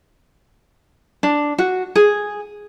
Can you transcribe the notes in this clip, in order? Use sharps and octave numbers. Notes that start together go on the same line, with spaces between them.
D4
F#4
G#4